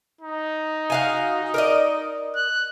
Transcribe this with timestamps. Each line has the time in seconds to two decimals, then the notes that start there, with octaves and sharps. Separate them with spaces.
0.21 D#4
0.90 F#4 F5 G#5
1.54 A#4 D5 D#5
2.36 F#6